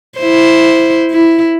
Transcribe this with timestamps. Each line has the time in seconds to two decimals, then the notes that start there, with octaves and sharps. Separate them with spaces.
0.19 E4 C5
1.11 E4